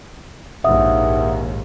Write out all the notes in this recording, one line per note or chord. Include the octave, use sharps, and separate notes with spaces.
A#1 D#2 G#2 E5 F#5 D#6